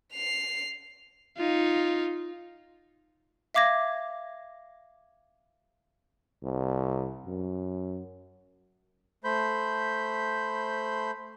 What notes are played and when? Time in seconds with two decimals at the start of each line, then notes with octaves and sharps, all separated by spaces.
0.13 C7 F7
1.37 D#4 F4
3.54 E5 F5 D6 G#6 A#6
6.43 C2
7.26 F#2
9.24 A3 C5 B5 G6